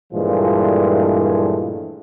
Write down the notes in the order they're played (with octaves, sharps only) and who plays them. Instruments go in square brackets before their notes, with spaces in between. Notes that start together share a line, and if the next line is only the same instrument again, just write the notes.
[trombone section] G2 A#2 E3 F3 G#3 A3